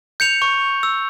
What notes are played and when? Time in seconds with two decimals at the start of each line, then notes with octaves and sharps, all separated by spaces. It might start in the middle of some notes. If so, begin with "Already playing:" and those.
0.20 G6 C#7 F7
0.42 C#6
0.83 E6